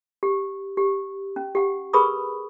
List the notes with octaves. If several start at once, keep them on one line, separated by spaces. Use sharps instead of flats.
G4
G4
C#4
G4 F#5
G#4 A#4 B4 B5 C#6 D#6